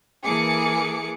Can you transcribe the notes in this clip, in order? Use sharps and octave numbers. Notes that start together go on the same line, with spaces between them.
E3 A#3 G#4 A4 D6 C#7